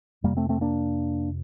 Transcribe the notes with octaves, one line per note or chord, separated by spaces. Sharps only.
F2 C3 G3 A#3
A3 C4
A3 C4
A#3 D4